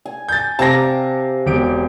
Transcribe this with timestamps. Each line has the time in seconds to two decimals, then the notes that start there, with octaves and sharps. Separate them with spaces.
0.05 G#5
0.28 G6 A6
0.59 C3 F5 A5 A#5 D6 A#6
1.46 E1 G4 D7